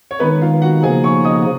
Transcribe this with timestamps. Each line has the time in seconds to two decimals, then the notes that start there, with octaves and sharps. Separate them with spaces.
0.11 C#5
0.20 D#3 G#3 B3 D#4 B4
0.41 F4 F5
0.62 F#4 F#5
0.83 C#3 F3 A#3 D#4 G#4 G#5
1.04 C#5 C#6
1.24 D#5 D#6